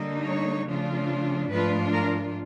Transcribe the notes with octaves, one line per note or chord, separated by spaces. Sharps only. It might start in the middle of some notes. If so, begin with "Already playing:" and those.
Already playing: D3 G3 A#3 D#4
C#5
C#3 F3 A3 D4 F4
G#2 F3 A3 D4 F4 B4
A#4